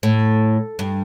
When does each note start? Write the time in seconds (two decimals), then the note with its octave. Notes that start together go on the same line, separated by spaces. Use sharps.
0.03 A2
0.79 G2